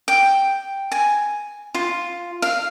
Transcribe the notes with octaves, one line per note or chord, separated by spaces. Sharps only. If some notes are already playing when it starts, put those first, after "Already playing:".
G5
G#5
F4
F5